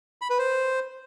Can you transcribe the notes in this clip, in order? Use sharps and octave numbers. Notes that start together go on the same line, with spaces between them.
B5
B4
C5